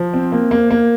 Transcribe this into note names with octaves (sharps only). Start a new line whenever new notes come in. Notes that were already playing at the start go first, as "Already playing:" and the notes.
Already playing: F3
C4
A#3
A#3
A#3